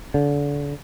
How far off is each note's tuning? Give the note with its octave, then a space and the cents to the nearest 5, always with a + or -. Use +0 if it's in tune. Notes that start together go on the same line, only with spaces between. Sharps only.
D3 -30